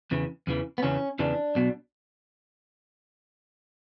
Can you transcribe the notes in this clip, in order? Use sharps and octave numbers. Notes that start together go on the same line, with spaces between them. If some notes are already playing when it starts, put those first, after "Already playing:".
E2 C#3 E3
E2 C#3 E3
B3
E2 C#3 E3 C#4
E2 C#3 E3 D4
B1 B2